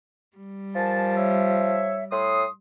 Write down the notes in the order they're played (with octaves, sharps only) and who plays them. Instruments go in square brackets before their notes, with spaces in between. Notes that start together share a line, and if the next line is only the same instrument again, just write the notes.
[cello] G3
[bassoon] F3 [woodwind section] A#4 G#5 A5
[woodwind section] C#5 E5
[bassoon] A2 [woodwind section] C6 D#6